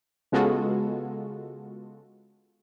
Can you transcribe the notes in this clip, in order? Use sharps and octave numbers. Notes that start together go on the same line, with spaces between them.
C#3 G#3 B3 F4 F#4 A4